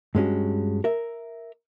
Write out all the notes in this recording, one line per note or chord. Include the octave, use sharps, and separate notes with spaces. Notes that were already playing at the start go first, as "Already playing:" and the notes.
G2 G#3 C#4 F#4
A#4 E5